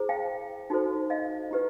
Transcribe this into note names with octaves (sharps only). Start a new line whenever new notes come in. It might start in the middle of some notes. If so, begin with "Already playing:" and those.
Already playing: E4 G#4 C5
F5 G5
D#4 F#4 A4 C5
D#5 F5
E4 G4 B4